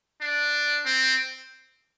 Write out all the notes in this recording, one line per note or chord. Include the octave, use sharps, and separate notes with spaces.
D4
C4